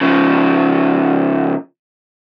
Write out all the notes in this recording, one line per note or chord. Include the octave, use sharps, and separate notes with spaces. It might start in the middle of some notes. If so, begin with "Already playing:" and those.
C#3 F3